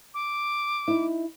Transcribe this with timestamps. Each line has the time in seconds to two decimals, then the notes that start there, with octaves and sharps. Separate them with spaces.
0.14 D6
0.88 D#4 E4